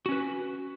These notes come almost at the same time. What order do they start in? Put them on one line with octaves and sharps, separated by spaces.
F#4 C#4 B4